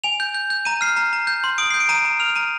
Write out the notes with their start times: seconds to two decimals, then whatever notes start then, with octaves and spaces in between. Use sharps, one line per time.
0.04 G#5 F7
0.20 G6
0.34 G6
0.50 G6
0.65 A#5 D#7
0.81 F6 C7
0.96 A#5
1.13 A#5
1.27 G6
1.44 C6
1.58 D#6 D7
1.70 G6 C7
1.80 D7
1.89 A#5 D#7
2.05 A#5
2.20 F6 F7
2.36 A#5 D#7